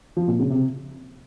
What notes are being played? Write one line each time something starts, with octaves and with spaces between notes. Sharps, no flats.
F3
A#2
C#3
C3